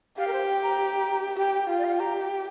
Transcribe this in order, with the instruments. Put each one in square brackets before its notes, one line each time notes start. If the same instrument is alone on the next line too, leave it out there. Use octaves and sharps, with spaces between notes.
[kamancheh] G4 [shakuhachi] F5
[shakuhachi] A#4
C5
G5
A#5
[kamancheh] G4 [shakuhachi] G5
[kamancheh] F4 [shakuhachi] G5
[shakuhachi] D5
F5
G5
[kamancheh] G4 [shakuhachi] A#5
[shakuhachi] G5
G5